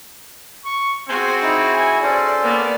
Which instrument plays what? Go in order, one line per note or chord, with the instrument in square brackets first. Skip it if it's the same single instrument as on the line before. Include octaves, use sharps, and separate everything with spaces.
[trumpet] C#6
[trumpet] C4 [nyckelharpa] F#4 G#4 [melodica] C5 G#5
[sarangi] D#4 [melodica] E4
[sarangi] G#5
[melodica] C#4 A4 C5 [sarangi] D5
[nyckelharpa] A#3 [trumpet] B3 [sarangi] D5